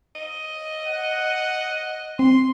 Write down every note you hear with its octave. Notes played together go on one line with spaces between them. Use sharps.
D#5
F#5
C4 C6